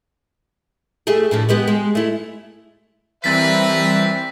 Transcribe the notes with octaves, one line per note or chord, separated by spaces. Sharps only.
A3 G4 G#4
A2 D3 F3
G#3 B3 G4
G#3
A3 E4
E3 G3 C4 A#4 B4 E5 A6 B6